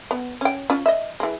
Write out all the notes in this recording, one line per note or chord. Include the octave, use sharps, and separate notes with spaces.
B3
C#4 G5
C#4 F4
D#5 E5
E3 G#3